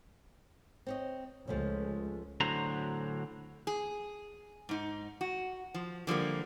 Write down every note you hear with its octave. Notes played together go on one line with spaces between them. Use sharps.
C4 C#5 D#5
C#2 F3 G#3 A3 C#4
D2 A2 D3 F#3 C5 A#5
G#4
G#2 D#4
F#4
F3
D3 F3 G3 A#3